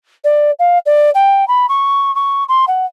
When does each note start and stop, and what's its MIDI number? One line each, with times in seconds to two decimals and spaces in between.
0.24 0.51 74
0.59 0.78 77
0.86 1.10 74
1.15 1.47 79
1.48 1.66 83
1.69 2.14 85
2.15 2.44 85
2.48 2.65 84
2.68 2.86 78